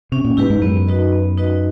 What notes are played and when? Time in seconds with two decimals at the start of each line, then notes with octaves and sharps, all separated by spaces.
0.12 C3 C#4
0.25 A#2
0.37 G#2 E4 G4 B4
0.50 G#2
0.62 F#2 B3
0.88 D#4 F#4 B4 D#5
1.12 B3
1.38 D#4 F#4 B4 D#5